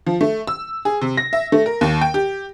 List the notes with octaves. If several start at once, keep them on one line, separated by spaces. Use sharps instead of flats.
F3
A3
E6
G#4
C3
A#6
E5
A3
A#4
D#2
G5
G4